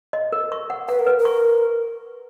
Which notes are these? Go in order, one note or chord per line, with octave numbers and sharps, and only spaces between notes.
D#5
A#4
C#6
F#5
B4 F#5
A#4
B4
A#4
C#6